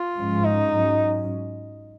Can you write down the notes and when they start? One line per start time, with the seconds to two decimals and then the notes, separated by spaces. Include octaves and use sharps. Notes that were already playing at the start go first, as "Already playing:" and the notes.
Already playing: F4
0.16 G#2 F3 G#3 C#4
0.44 D#4
0.72 G#2 F#3 C#4